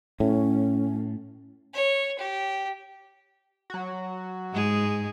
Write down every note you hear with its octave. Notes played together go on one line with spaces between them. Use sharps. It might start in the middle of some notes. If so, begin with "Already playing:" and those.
A2 C#4
C#5
G4
F#3 F#4
G#2 G#3 G#4